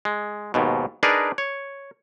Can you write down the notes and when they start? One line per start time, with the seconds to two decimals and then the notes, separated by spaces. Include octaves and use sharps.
0.05 G#3
0.54 D#2 G#2 B2
1.03 D4 D#4 G#4 A#4 B4 D5
1.38 C#5